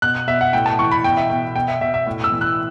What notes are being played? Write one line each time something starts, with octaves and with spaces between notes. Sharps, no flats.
B2 F#6
B2 E5
F#5
A2 G5
A5
E3 C#6
B5
B2 G5
E5
B2 G5
B2 G5
E5
B2 E5
E5
A2
E6
E3
F#6